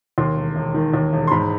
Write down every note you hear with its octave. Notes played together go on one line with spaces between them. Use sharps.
D#2 C6
E1
E1
D#3
D#2
E1
C6
G#2 B5